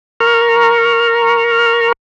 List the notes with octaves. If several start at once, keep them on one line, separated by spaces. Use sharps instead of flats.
A#4 A#5 C#6 F6